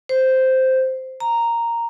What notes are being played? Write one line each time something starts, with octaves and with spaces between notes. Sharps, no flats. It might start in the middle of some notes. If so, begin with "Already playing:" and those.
C5
A#5